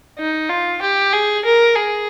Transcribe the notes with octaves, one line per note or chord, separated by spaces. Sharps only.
D#4
F4
G4
G#4
A#4
G#4